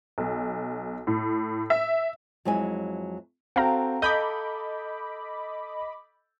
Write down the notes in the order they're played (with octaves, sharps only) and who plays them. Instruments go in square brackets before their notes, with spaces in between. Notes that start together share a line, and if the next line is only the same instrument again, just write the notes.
[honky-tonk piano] B1
A2
E5
[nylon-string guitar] F2 F#3 G#3 E4 G#5
[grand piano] C4 F#4 A4 [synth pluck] F5 G5 A#5
[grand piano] A4 G6 [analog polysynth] D#5 B5 D6